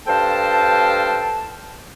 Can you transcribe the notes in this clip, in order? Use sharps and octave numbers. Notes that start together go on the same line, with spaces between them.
G2 A4 C5 F5 G5 A5